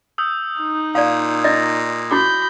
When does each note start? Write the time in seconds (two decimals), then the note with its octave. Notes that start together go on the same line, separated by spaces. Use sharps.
0.18 D#6 E6 G6
0.61 D#4
0.95 A#2 D5 F5 D#6 G#6
1.44 D5 D#5 A#6
2.11 E4 F#4 B5 D6 G6